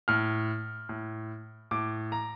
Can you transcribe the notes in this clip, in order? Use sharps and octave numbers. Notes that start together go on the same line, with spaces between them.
A2 F6
A2
A2 D6
A#5